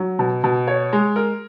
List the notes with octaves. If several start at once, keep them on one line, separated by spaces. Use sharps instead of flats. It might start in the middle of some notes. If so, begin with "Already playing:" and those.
Already playing: F#3
B2
B2
C#5
G#3
A#4